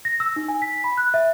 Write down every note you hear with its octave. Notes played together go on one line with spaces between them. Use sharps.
A#6
E6
D#4
G#5
B6
B5
F#6
E5